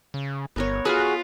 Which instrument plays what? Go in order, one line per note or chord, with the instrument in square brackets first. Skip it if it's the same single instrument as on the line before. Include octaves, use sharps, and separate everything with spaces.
[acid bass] C#3
[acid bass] G1 [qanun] B3 A#4 C#5
[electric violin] F4 [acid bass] F#4 [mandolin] G#4 F6 [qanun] B4